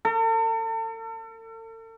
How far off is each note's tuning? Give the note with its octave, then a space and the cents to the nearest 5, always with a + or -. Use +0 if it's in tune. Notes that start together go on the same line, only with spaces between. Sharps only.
A4 +40